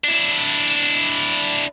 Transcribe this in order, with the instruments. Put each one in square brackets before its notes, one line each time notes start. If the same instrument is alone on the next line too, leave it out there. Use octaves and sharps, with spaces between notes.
[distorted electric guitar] D4 E4